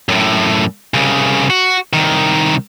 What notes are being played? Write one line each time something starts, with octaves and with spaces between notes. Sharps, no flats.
F#2 A2
C2 C#3
F#4
C2 D#3